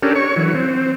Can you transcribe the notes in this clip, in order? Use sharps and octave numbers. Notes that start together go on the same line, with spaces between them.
C#4 D4 G4 A4 A#4
C#5 C#6
E3 F#3
C4